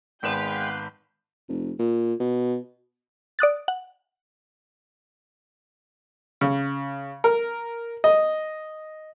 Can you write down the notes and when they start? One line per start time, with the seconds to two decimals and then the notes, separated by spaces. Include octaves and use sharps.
0.23 G#1 G#3 B3 B4 F5 G5 G6 E7
1.49 F1
1.79 A#2
2.20 B2
3.39 D5 D#6 F#6 A6
3.68 F#5
6.41 C#3
7.24 A#4
8.04 D#5